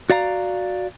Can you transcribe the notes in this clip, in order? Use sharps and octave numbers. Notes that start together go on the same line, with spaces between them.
F#4 D5 F5 A#5